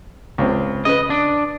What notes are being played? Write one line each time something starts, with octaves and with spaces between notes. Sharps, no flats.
C#2 C4
C#3 B4 D#5
D4